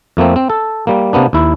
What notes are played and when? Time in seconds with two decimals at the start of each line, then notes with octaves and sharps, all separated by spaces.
0.17 F2 A3 A#3 C4
0.36 C4
0.50 A4
0.87 G3 A#3
1.13 C3 A#3 B3 D4
1.33 D#2 E4